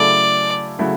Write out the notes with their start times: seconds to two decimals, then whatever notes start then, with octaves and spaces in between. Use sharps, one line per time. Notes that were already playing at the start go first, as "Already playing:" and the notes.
Already playing: C#3 F#3 A3 E4 A4 D5
0.79 C#3 F#3 A3 E4 A4